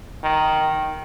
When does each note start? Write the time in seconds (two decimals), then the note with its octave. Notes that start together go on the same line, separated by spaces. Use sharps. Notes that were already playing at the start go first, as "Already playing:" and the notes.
0.23 D#3